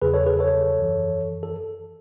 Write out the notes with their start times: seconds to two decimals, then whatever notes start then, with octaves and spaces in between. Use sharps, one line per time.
0.02 E2 C#3 F#3 G#4 B4
0.14 A4 C#5
0.27 G#4 B4
0.39 A4 C#5
0.78 F#2 E3
1.43 A4